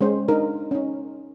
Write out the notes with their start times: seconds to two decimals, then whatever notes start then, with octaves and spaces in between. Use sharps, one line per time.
0.01 G#3 C#4 C5
0.28 D4 D#4 A#4
0.71 C#4 D#4